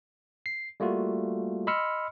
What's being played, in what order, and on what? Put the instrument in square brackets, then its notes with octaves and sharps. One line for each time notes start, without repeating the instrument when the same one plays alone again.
[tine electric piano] C7
G3 A3 A#3 F4 F#4
D#5 B5 C6 E6 F6 C#7